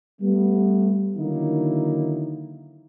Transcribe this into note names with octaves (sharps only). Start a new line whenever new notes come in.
G3 A3 B3
D3 D#3 F#3 A#3 D#4 E4